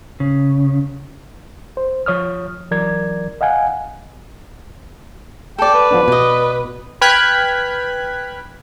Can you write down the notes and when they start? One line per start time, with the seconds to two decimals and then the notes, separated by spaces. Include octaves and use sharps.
0.20 C#3
1.77 C5
2.06 F3 C#5 D#6 F6
2.71 E3 F#3 A#4 D5 G#6
3.41 D#5 F5 F#5 G#5
5.59 A4 D5 G5
5.74 B4
5.91 F3 B3 D4
6.08 B2 D5 D#5
7.01 B4 G5 F6 F#6 G#6 B6